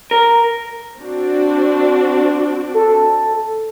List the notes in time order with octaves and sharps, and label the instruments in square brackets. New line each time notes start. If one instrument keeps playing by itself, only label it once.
[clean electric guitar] A#4
[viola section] C4 D4 F#4
[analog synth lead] A4